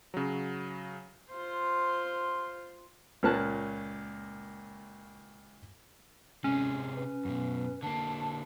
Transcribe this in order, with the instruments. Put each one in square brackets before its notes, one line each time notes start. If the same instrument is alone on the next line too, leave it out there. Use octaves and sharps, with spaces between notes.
[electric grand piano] C#3 F#3
[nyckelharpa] F4 C5
[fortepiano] C#2 A#2 A#3 C#4 A5 F#6
[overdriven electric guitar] C3 G#3 [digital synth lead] C#4
[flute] B4
[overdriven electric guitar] F#2 B2
[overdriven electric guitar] D3 A#3 [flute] A5